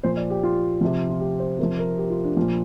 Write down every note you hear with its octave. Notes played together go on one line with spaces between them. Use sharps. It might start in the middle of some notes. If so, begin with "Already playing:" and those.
A#2 F3 C5
D5
G4
F4
C3 F3
F4
G4
C5
C3 F3 A#4
A#4
G4
F4
D4
A#2 F3 F4